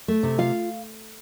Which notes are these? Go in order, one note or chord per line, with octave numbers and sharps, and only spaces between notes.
A3
C3
F4 F5